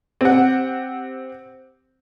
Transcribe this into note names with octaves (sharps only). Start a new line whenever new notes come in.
C4 G4 F#5